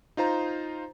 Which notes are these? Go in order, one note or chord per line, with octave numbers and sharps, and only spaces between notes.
D#4 F4 C5 A#5